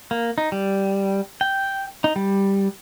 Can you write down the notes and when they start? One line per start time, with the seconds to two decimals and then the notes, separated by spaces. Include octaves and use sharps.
0.11 A#3
0.38 D#4
0.52 G3
1.41 G5
2.04 D#4
2.16 G3